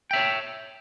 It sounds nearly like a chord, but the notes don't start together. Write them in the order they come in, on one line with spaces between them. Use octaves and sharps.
G5 E5 C#5